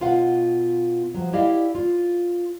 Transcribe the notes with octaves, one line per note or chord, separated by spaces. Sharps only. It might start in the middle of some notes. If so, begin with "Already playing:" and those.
B2 F4 F5 F#5
F3 F#3
E4 G4 D5 D#5 F5
F4